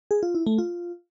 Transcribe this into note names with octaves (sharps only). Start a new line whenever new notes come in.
G#4
F4
E4
A3
F4